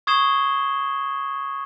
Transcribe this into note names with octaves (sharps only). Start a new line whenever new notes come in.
C#6 D#6 G#6 C7 E7 G7